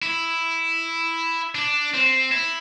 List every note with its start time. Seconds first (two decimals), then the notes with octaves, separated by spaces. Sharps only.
0.03 E4
1.55 D4
1.94 C4
2.32 E4